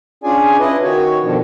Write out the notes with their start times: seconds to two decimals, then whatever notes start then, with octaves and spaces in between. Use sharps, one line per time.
0.24 C#4 D4 F4 G#4 D5 G#5
0.60 C#3 E4 B4 D#5
0.83 D#3 F#4 C#5
1.22 B2 D3 D#3 F3